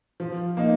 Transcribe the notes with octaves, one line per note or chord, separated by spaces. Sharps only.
F3
A#3 D#4